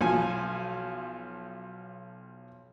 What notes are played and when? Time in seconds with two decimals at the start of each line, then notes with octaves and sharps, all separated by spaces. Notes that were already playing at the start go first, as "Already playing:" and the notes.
0.01 B1 F3 G#5